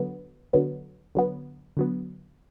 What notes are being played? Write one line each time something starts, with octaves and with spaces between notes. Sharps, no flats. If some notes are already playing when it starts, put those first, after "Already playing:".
Already playing: D3 F#3 B3
D3 F#3 B3
D3 F#3 B3
D3 F#3 B3